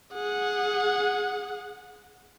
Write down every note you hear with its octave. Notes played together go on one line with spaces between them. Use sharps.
G#4 F#5